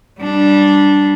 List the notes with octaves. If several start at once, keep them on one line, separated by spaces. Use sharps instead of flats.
G3 D4